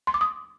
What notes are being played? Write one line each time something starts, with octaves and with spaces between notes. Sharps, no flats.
C6
D6
D#6